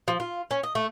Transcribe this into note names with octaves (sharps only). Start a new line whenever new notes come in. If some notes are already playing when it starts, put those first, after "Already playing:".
F3
F4
C#4
D#5
A3